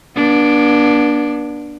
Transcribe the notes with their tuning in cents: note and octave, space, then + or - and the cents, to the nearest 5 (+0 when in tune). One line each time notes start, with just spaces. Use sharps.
B3 -45 D4 +0